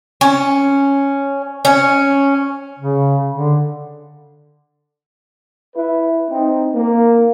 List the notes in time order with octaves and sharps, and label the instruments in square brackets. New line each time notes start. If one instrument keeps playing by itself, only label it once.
[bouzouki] C#4
C#4
[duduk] C#3
D3
[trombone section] E4 B4
C4 D#4
A#3